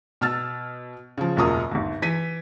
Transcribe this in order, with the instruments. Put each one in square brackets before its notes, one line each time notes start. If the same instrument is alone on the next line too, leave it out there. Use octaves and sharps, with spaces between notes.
[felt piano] B2 E6 F6 A6
C#3 F3
E1 F#2 A#3 F4 A#5 D#6
G1 D#2
E3 B6 D#7